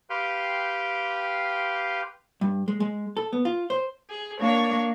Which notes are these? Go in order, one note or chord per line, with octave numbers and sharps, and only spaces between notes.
G4 B4 F5 G5 C6
G2
G#3
G#3
A4
B3
F4
C5
G#4
A#3 D4 C#5 G#6